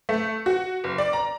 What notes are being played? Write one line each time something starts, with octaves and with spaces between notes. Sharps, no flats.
A3
F#4
F#1
D5
A#5